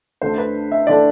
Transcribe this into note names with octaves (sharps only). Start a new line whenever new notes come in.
D2 D3 A3 D4 C5
B4
E5
D3 A3 D4 D5